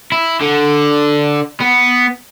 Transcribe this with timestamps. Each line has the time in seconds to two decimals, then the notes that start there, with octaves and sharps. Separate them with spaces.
0.12 E4
0.41 D3
1.61 B3